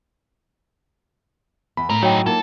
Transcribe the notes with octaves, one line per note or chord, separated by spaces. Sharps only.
E2 B5
A2 C#4 A#4
G2 F#3 D#4 C#5 G5
A#3 D#4 F4 A4